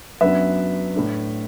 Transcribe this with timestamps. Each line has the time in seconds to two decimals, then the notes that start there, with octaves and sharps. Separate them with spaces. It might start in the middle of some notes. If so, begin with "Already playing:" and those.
0.21 F#2 F#3 B3 D4 B4 E5
0.95 A2 A3 D4